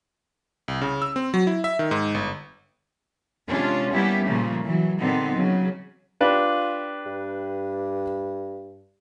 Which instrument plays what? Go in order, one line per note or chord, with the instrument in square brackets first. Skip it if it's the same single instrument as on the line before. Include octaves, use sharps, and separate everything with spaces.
[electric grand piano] C2
C#3
E6
C4
F#3
E4
E5
D#3
G#2
G1
[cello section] C3 G#3 C#4 D4 F4
G3 A#3 B3 C#4 E4 G4
A#2 C#3 F3 G3 A3 A#3
E3 F#3
A#2 D3 G3 B3 C4 D#4
C#3 F#3
[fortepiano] D4 G4 B4 [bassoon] F4
[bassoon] G2